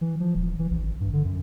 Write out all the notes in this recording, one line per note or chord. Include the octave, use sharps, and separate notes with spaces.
E3
F3
D#1
E3
A#1
G#1
G2
D3
F#2